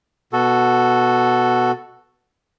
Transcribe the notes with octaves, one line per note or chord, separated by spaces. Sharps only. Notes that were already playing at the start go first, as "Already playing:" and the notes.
B2 F#4 A4